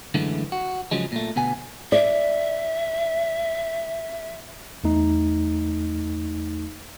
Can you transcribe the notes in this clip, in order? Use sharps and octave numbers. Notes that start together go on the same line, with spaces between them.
F#2 D3 E3 G#3 A3
F#4
C#3 F3 F#3 G#3
A#2 A3
D2 B2 B3 G#5
D5 E5
E2 A3 D#4